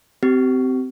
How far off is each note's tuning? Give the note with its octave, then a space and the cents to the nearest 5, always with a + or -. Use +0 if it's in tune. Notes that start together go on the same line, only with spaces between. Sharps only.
C4 -20 G4 -30